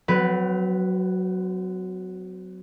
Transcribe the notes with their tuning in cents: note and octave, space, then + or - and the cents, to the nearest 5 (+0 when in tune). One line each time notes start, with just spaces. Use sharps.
F#3 +0 C4 -45 B4 +0